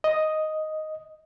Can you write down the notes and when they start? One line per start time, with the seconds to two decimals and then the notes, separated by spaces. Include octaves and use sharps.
0.04 D#5